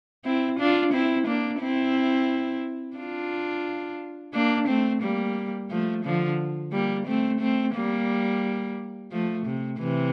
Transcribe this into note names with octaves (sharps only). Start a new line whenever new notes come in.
C4 E4
D4 F4
C4 E4
A#3 D4
C4 E4
D4 F4
A#3 D4
A3 C4
G3 A#3
F3 A3
D3 F3
G3 A#3
A3 C4
A3 C4
G3 A#3
F3 A3
C3
C3 E3